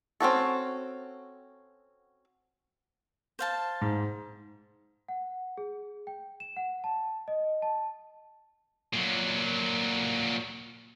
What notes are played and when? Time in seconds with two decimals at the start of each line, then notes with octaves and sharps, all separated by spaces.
0.20 C4 C#4 F#4 A4
3.39 C5 F5 A5
3.81 G#2
5.09 F#5
5.58 G#4
6.07 G5
6.40 E7
6.56 F#5
6.84 A5
7.28 D#5
7.62 A5
8.93 A#2 F#3